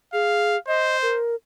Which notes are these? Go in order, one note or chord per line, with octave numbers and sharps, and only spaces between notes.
G#4 F5
C5 D#5
A#4